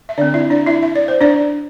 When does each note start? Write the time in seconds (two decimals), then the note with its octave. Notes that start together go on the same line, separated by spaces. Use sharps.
0.09 E5
0.18 D3 C4 D4 D5
0.34 E4 E5
0.50 D4 D5
0.66 E4 E5
0.83 E5
0.96 D5
1.08 C5
1.21 D4 D5